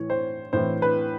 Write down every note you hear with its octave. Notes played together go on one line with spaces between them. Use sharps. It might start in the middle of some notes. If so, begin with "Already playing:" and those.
Already playing: A2 E3 C#5
C5
A2 E3 C5
B4